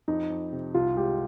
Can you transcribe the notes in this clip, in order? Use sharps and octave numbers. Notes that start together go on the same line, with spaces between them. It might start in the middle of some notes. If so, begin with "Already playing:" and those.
F2 D#4
F2
C3
C2 F4
G#3 G4